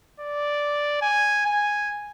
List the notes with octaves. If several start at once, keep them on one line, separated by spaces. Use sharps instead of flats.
D5
G#5
G#5